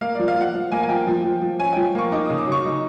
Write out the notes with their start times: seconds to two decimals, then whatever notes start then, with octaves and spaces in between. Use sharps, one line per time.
0.01 A#3 F5
0.15 F3 D5
0.28 F5
0.37 F3 F#5
0.55 F3
0.72 A#3 G#5
0.83 G#5
0.89 F3 G5
1.07 F3
1.24 F3
1.42 F3
1.60 C#4 G#5
1.73 F3 G5
1.95 A#3 C#6
2.12 D#4 D6
2.26 C#3 D#6
2.38 D6
2.47 F#3
2.52 C#6
2.65 D#4